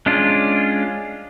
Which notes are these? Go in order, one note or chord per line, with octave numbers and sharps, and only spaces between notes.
G#3 C#4 D4 F4